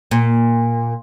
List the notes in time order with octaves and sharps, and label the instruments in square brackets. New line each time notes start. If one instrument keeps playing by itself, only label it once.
[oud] A#2